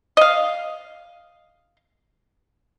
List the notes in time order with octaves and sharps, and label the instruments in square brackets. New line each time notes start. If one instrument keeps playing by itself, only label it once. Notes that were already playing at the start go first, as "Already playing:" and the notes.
[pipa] D#5 F5